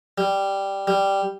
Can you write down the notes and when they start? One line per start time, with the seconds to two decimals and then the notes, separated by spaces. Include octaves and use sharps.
0.18 G3
0.87 G3